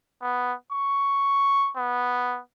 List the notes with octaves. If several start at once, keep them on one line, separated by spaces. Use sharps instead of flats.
B3
C#6
B3